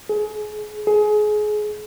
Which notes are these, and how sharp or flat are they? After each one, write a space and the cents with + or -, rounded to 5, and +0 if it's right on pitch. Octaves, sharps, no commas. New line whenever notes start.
G#4 +30
G#4 +25